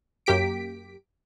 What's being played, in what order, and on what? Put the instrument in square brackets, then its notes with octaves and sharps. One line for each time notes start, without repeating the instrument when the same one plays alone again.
[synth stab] F#2 A#3 G4 B6 D7